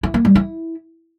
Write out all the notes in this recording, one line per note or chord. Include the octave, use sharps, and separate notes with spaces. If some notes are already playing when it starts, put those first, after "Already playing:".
E4
A#3
G3
E4